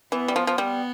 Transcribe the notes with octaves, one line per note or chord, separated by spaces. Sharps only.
E3 B3
G3
F3
F3
G3 B3